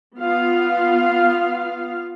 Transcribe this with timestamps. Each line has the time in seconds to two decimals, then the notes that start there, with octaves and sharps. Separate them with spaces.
0.19 B3 F4 F5